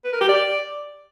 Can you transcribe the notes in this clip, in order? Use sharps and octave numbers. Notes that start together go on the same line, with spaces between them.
B4
A#4
G4
D5